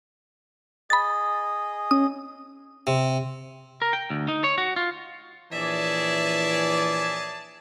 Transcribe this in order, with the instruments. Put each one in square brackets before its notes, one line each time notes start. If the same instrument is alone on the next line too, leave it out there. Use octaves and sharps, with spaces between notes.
[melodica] G#4 D#5 [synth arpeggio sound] B5 A6
[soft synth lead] C#4 [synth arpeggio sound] D#6
[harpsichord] C3
[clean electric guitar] A#4
G5
D2
D#4
C#5
F#4
F4
[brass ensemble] A#1 C#5 D5 [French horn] E3 [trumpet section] G#4 G#5 A5 [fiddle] E5